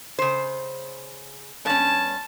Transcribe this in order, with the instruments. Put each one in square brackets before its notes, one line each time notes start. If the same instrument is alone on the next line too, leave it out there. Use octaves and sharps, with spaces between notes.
[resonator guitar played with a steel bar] C#3 C5
[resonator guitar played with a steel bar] G2 C#4 [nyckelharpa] A5